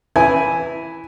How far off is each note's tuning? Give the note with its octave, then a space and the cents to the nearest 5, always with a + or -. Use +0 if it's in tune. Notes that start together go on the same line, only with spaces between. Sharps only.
E3 +0 E4 +0 G#5 +0